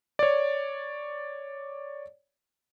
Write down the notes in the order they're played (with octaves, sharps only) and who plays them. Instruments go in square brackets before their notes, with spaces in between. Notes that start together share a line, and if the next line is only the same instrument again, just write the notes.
[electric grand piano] C#5 D5